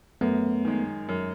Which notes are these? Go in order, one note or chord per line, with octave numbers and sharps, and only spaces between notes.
F#2 A3 B3
D#3 G#3
F#2